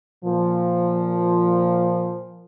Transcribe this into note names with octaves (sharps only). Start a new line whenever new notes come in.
A#2 F3